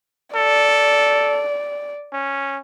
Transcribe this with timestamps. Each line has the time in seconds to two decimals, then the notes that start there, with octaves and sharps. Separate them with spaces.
0.35 A4 D5
2.13 C#4